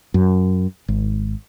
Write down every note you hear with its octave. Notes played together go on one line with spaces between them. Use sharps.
F#2
G#1